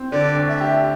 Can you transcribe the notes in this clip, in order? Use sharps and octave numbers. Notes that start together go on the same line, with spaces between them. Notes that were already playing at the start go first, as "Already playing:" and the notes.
Already playing: C4
D3 D5
D2
E5
G4